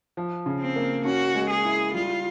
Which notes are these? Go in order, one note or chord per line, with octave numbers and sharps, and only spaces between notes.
F3
C#3
C4
A#3
C#4 F#4
G#3
G#4
E4
G3 F4